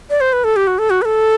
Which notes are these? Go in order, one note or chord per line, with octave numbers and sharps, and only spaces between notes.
D5
C5
B4
A4
G4
F#4
A4
F#4
B4
A4